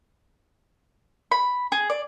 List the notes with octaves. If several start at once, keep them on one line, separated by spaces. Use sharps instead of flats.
B5
G#4
D5